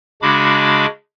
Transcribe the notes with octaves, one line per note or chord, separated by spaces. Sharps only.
C#3 G#3 D4 F#4 B5 D6